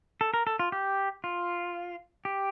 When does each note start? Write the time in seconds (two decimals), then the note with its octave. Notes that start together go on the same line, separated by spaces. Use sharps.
0.21 A4
0.34 A#4
0.47 A4
0.59 F4
0.72 G4
1.24 F4
2.25 G4